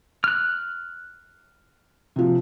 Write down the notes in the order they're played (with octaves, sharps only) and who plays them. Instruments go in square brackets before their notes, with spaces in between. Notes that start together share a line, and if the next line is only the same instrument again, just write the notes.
[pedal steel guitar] F6 F#6
[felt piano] C3 F3